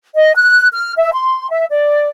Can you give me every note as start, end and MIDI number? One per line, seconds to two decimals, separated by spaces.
0.16 0.32 75
0.36 0.68 90
0.72 0.92 89
0.97 1.10 76
1.12 1.50 84
1.50 1.65 76
1.70 2.09 74